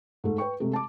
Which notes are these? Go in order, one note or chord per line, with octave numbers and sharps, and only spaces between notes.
G#2 A3
B4 G5 C#6
C3 G#3 A3
A5 D6